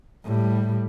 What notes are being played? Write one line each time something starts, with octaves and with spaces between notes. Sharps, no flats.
A2 G3